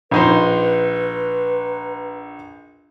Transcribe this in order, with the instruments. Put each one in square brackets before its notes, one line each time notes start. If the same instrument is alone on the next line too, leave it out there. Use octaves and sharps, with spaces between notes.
[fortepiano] A#1 D#4 C5 [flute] B4